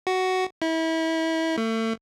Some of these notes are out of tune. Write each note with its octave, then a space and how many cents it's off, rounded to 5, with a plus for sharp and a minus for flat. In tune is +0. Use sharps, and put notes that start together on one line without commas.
F#4 +10
E4 -30
A3 +35